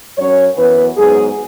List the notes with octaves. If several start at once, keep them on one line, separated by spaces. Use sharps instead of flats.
F#2 F#3 C#4 C#5
F#2 E3 B3 B4
G#2 F#3 B3 G#4